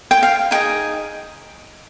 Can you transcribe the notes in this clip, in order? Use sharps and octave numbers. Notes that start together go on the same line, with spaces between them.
G5
F5
D#4 G#4 D#5 G5